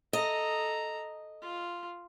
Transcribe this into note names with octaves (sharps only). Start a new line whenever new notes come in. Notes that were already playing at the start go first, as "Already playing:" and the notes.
A4 D#5 A#5
F4